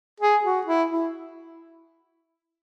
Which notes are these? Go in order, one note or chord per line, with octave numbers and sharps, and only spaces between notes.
G#4
F#4
E4
E4